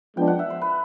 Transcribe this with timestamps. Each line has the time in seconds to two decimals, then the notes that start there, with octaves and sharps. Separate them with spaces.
0.16 F3 G#3 B3 D4 G5
0.27 F#5
0.39 E5
0.50 C5
0.61 B4